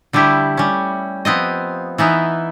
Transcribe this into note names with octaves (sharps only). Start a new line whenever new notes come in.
D3 G3 A3 E4 G4
G3 C#4
F3 B3 C4 D#5
E3 B3 D#4 E4